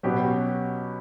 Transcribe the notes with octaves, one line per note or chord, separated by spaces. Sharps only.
B2 F#3 C#4 G4 B4